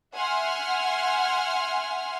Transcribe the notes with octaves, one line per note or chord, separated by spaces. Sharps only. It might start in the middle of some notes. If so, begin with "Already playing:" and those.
E5 F#5 G#5 C6 F6